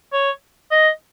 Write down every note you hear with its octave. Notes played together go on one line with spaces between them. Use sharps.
C#5
D#5